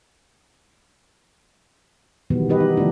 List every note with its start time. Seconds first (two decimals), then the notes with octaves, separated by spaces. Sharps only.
2.30 B2 D#3 E3 F#3 G3 B3
2.49 G3 D#4 G4 B4 D#5
2.60 D#4 F#5
2.77 D3 F3 G3 A3 D4 E4